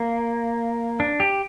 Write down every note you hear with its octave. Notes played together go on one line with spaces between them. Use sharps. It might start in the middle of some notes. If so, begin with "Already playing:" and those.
Already playing: A#3
D4
G4